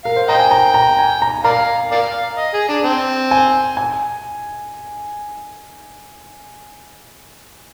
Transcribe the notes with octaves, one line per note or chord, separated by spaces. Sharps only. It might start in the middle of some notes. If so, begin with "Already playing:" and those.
A#4 F5
C5
C5 D#5 G5 A#5
G#5
A#5
A#5
G#5
A#5
A#4 D5 F5 A#5
A#4 D5 F5
D#5
G#4
D4
C4
G#5
G#5